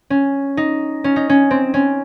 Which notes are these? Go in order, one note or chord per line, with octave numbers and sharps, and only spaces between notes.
C#4
D#4
C#4
D#4
C#4
C4
C#4